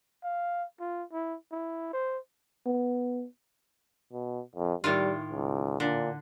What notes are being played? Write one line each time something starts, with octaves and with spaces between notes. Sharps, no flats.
F5
F4
E4
E4
C5
B3
B2
F2
A2 D#3 G3 F4
C#2
A#2 D3